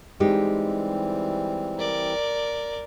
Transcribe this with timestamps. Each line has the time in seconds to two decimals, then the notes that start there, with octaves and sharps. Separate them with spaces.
0.20 E3 G3 G#3 C4 D#4 G4
1.79 A#4 D5